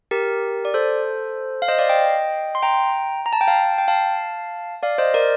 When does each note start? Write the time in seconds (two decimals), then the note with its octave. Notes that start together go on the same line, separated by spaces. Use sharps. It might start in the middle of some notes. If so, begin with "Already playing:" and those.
0.11 G4 A#4
0.65 D5
0.74 A4 C5
1.62 F5
1.68 C5 D#5
1.78 D5 F5
1.89 D#5 G5
2.55 C6
2.62 G5 A#5
3.26 A#5
3.33 A5
3.41 G5
3.48 F5 A5
3.78 G5
3.88 F5 A5
4.83 D5 F5
4.98 C5 D#5
5.14 A#4 D5